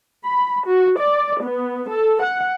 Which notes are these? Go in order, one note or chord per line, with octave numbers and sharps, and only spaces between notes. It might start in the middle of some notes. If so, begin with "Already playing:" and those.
B5
F#4
D5
B3
A4
F#5